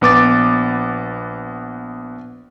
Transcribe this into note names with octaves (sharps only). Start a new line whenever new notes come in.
A#1 B3 D6 A6